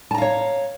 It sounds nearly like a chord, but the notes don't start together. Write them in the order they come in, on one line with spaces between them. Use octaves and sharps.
A5 A#5 F5 C#5